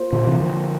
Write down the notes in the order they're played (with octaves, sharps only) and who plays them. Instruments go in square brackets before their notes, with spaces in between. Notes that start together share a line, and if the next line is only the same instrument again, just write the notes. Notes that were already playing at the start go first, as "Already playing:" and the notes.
Already playing: [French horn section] A#3 F4 C5
[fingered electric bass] A#2 D3
C3 E3
D3 F3